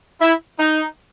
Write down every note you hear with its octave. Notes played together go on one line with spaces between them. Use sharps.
E4
D#4